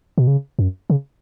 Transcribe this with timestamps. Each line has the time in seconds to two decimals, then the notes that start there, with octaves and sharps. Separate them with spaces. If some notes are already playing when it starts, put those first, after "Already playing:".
0.18 B2
0.27 C#3
0.59 F#2
0.90 C#3